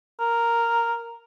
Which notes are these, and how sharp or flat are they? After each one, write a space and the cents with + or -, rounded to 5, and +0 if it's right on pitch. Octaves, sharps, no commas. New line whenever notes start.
A#4 +0